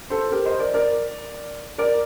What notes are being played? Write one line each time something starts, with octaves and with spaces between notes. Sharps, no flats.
A4 C5
G4 A#4
C5 D#5
A#4 D5
A#4 D5
A#4 D5